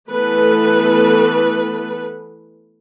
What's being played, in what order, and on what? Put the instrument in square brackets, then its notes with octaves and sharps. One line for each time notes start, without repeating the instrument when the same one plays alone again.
[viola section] E3 A3 B3 A4 B4